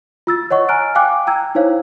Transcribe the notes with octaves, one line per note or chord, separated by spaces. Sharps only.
F4 E6 A6
C#5 D#5 F#5 C#6
G#5 A#5 F6 F#6 D7
F5 G5 G#5 D6 F#6
G5 A#5 E6 G#6
D#4 E4 C5 C#5 F5